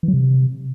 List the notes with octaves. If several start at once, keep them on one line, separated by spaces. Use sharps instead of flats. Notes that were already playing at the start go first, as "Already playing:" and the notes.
E3
F#3
C3